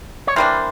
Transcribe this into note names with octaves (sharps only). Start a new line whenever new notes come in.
C#5
E3 G3 A#3 D4 A#4 C5